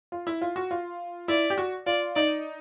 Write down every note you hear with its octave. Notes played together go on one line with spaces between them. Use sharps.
F4
E4
F4
F#4
F4
E4 D5
G4
F#4
F4 D5
D#4 D5